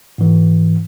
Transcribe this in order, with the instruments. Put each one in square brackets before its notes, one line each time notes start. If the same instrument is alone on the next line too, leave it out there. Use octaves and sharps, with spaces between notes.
[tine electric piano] G#2 E3